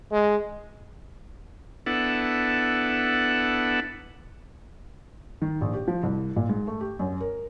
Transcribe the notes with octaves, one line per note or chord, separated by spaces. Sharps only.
G#3
B3 D4 E4 A4 F#5
D#3
A#1
G4
F3
C2
A#2
G#2
A3
G4
F#2
A#4